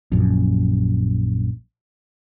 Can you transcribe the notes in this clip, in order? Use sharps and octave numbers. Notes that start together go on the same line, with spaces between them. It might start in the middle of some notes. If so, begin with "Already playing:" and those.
A#1 F#2